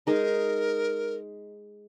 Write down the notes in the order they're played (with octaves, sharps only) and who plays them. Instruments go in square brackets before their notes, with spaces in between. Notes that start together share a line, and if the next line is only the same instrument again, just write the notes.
[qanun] G#3 D#4 [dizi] A#4